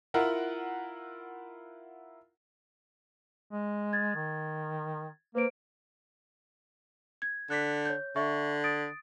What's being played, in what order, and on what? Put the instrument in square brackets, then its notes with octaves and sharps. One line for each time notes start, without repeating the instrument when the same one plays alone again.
[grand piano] E4 F4 A#4 F#5
[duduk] G#3
[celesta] G#6 A6
[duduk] D#3
[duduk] A#3 [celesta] B4 C5 D7
[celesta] G#6
[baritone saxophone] D3 [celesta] F#6 B6
[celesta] C#5 G6
[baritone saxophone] D3 [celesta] E5 C#6
[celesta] D#6 A6 D7